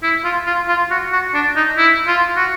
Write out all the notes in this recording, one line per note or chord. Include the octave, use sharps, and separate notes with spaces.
E4
F4
F4
F4
F#4
F#4
D4
D#4
E4
F4
F#4